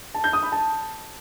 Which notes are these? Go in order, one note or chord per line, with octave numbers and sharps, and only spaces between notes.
A5
G6
D#6
B5
A5